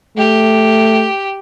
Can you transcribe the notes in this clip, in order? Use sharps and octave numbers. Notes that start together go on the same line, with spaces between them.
A3 G4